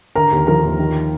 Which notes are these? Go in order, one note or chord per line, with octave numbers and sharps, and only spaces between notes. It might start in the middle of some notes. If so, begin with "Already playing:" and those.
D3 A#4 A#5
D#2
F3 A#4 A#5
D#2
D#3